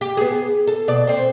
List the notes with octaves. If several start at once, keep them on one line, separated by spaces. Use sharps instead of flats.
G4
B3 G#4
A4
B2 D5
C4 C5